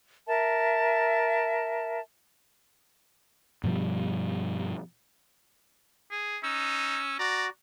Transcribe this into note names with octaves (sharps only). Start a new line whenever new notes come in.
A#4 E5 A5
G2 B2 F3 G3
G#4
C#4 D#4 E6
F#4 D5 A#5